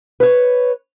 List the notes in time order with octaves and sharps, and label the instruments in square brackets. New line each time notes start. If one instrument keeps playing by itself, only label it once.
[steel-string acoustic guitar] B4 C#5